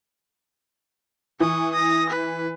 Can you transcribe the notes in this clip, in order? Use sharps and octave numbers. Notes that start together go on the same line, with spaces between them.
E3 C#6 D#6
D#6 A#6
B4